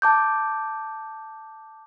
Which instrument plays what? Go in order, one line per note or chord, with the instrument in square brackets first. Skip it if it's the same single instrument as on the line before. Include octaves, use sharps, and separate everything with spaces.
[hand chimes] A5 D6 G6